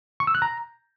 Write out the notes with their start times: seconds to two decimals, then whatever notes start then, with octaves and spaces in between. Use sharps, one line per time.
0.20 C#6
0.27 E6
0.35 F#6
0.42 A#5